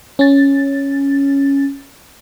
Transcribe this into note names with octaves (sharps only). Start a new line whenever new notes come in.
C#4 A6